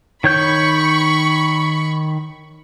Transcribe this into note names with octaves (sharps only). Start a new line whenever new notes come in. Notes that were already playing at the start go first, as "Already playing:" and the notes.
D#3 C#5 B5 C#6 G6